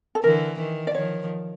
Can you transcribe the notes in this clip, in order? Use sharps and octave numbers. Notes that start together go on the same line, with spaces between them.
A4
D3 E3 A#4
D#3
D5
D#3 F3 C#5